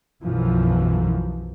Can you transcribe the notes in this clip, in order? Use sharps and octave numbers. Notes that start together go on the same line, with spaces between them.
B1 F#2 E3 F3